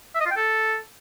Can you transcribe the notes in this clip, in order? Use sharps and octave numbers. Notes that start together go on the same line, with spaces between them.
E5
D#5
F4
G5
A4